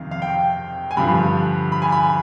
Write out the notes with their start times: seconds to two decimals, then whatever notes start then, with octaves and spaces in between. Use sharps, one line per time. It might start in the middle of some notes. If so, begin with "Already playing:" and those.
Already playing: F2 C3 D#3 F5
0.11 F5
0.22 G5
0.91 G#5
0.97 G2 D3 F3 B5
1.72 B5
1.82 G#5
1.92 B5